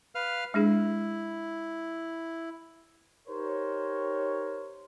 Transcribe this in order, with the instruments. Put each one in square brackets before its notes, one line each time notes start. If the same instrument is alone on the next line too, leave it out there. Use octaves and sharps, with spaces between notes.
[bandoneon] B4 F5 F6
[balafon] G#3 D4 G#4 [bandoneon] E4
[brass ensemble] D#4 G4 A#4 C5 C#5